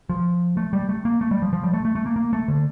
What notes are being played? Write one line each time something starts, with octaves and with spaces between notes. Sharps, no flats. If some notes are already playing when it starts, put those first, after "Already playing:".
F3
A3
G3
A3
A#3
A3
G3
F3
F3
G3
A3
A3
A3
A#3
A#3
A3
D3